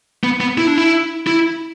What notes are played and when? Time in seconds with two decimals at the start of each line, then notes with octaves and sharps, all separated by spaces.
0.23 B3
0.40 B3
0.58 E4
0.67 D4
0.78 E4
1.27 E4